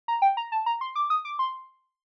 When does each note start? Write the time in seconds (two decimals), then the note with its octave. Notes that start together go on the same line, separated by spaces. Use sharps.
0.08 A#5
0.22 G5
0.37 A#5
0.52 A5
0.66 A#5
0.81 C6
0.95 D6
1.10 D#6
1.25 D6
1.39 C6